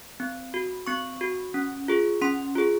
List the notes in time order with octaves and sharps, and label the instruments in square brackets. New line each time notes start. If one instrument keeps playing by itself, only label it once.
[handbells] C4
F#4
C4 C#6
F#4
C#4
F4 G#4
C#4 C6
F4 G#4